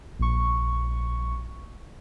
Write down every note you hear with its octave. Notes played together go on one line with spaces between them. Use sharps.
A#1 C#6